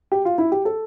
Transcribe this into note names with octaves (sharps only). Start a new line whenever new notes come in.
G4
F4
E4
G4
A4